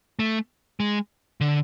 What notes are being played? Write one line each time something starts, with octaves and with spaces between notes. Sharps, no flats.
A3
G#3
D3